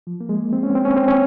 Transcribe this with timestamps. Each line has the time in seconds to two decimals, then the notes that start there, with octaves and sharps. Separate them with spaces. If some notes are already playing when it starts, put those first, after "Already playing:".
0.07 F3
0.20 A#3
0.29 G#3
0.53 C4
0.63 C#4
0.75 C4
0.85 C#4
0.97 C4
1.08 C#4